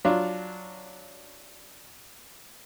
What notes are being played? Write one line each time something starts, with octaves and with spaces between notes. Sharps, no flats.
F#3 D4 F4